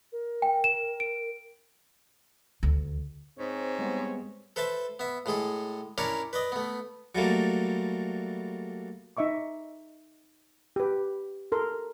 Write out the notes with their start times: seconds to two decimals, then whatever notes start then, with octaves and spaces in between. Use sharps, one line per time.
0.12 A#4
0.42 G5
0.64 E7
1.00 D7
2.63 D2
3.39 G#2 C4 C#5
3.79 G3 G#3 B3
4.56 A4 B4 C5 E5 A5
4.99 B3 E5
5.26 A2 G#3 G#4 A4
5.98 C#4 D4 E4 A#4 C#5 D5
6.33 B4 D5 D#5
6.52 A3 B3
7.15 F#3 G3 A3 A#3
9.17 D#4 D#5 E5 C#6 D6
10.76 G4 B4
11.52 A4 A#4 C6